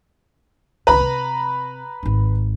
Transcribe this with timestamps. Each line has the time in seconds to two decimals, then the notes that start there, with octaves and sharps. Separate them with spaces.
0.87 C2 D3 B4 A#5 B5
1.01 C3
2.03 G#1 D#3